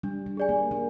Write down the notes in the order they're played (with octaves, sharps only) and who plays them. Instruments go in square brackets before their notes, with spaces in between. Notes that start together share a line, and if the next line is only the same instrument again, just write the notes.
[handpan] G3 [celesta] D4
[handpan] G3
[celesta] G#4 D5 G#5
[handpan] A#3
[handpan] A#3 [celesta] D4